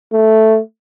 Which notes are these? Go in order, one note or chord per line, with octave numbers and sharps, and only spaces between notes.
A3